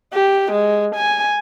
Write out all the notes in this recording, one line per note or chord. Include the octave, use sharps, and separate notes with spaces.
G4
G#3
G#5